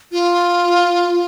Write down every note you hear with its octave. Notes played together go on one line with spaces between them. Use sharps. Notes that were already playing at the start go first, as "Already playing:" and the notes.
F4